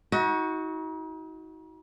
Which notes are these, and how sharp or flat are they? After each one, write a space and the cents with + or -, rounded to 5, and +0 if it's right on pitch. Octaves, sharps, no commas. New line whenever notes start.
D#4 +40 F#4 +0